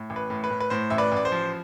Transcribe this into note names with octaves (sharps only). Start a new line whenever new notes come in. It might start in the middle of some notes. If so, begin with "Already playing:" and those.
Already playing: A2
A1
B4
A2
B4
A2
B4
A2 C5
A1 E5
B4 D5
A1 D5
C5
F3